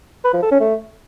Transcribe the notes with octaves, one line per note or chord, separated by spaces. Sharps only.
B4
F3
A4
C#4
A3